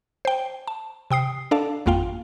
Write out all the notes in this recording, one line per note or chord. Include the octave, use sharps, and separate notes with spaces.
C5 G5
A5
C3 G5 D#6 C7
D4 A4 D5 F5 A5
G#1 F2 A#3 F4 F5 G5